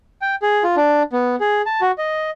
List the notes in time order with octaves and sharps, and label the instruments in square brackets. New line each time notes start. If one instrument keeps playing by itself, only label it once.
[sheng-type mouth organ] G5
G#4
F4
D4
B3
G#4
A5
F#4
D#5